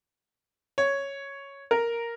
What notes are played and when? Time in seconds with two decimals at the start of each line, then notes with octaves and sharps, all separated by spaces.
0.78 C#5
1.71 A#4